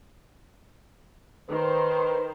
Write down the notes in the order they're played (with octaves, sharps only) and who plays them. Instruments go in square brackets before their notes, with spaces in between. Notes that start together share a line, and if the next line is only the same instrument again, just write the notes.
[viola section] D#3 C5 [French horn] B4